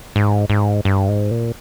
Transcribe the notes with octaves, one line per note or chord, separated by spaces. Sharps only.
G#2
G#2
G2
G#2
A#2